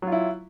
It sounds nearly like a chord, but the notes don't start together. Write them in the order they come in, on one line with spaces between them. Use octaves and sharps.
F#3 F4 E4